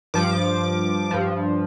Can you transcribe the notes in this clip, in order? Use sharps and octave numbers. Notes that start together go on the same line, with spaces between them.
G2 F3 D6
G2 F3